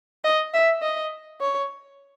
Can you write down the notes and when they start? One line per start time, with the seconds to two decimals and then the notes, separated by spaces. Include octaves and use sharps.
0.24 D#5
0.54 E5
0.82 D#5
1.40 C#5